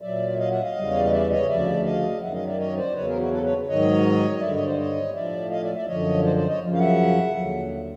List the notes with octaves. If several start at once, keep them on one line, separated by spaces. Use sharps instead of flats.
A#2 F#3 D5 E5
E5
D#5 F5
E5 F#5
D#5 F5
E2 C#3 E3 G3
C#5
D5
D#5
D5 E5
C#5 D#5
D2 C#3 F3 D5 E5
D#5 F5
F#2 D#3 F#3 E5 F#5
D#5 F5
D5 E5
C#5 D#5
C5 D5
E2 C#3 F#3 B4 C#5
G#4 A#4
E4 F#4
A4 B4
B4 C#5
G#2 D#3 F#3 C#5 D#5
D#5
G2 D3 G3 D5 E5
C#5 D#5
C5 D5
C#5 D#5
A2 F3 D5 E5
D#5 F5
D5 E5
D5 E5
F#2 D3 F3 C#5 D#5
C5 D5
C5 D5
C#5 D#5
F#2 C#3 F3
F5
E5 F#5
D#2 D3 F#3